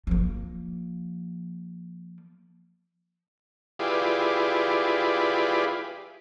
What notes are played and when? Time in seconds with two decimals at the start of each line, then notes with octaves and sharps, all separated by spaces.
0.07 F3 A#3
3.79 E4 F4 G4 G#4 B4 D5